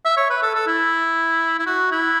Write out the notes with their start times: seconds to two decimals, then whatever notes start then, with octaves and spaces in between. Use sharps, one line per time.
0.05 E5
0.17 C#5
0.30 B4
0.42 A4
0.55 A4
0.67 E4
1.59 E4
1.66 F#4
1.91 E4